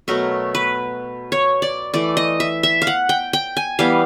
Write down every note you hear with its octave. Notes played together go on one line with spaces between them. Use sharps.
B2 F#3 A3 A#4
B4
C#5
D5
E3 A3 D5
D#5
E5
E5
F5
F#5
G5
G5
G#5
E3 G3 B3 F5